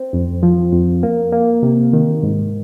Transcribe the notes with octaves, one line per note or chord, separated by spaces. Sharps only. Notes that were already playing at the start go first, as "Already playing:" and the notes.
Already playing: C4
F2
F3
F2
A#3
A#3
C3
D#3
G#2